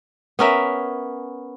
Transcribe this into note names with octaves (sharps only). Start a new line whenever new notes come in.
B3 C#4 A#4 E5